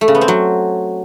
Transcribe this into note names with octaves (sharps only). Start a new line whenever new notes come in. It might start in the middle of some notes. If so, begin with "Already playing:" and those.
A3
C#3
B3
C4
F#3